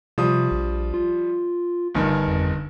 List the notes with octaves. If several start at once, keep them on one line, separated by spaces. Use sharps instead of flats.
C3 F3 G3 D#6
A#1
F4
G1 G2 D#3
F2